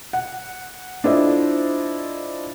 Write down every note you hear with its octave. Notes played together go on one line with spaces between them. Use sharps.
F#5
D4 E4 F4 A4 C5 D#5